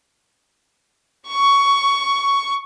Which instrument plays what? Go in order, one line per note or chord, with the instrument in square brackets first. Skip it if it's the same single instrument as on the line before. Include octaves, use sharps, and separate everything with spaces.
[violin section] C#6